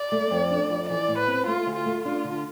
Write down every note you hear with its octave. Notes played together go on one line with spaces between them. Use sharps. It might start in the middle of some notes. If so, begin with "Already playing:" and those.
Already playing: D5
A3
F2
D4
F2
E3 D5
A2
B4
C4
A3 F4
D2
F4
A3
D4 F4
D3